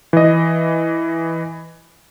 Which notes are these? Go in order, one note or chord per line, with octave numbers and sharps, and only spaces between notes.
E3 D#5